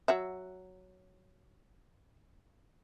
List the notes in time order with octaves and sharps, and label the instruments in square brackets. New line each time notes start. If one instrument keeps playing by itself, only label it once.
[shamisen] F#3 F#4 E5